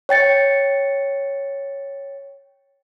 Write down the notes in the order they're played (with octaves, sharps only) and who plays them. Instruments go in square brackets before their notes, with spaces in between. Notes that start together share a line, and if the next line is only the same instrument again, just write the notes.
[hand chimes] C#5 G5 A6 C#7